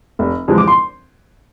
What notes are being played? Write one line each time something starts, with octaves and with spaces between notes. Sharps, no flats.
F1
F2 E3 G#3
D6
C6